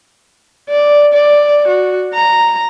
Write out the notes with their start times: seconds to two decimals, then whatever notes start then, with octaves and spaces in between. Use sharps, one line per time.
0.69 D5
1.14 D5
1.67 F#4
2.14 A#5